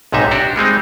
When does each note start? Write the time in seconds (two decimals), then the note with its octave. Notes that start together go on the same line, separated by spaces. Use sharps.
0.12 B1 G#2 C3 D#4 E5
0.31 D4 F#4 G4
0.56 G3 G#3 C4 D#4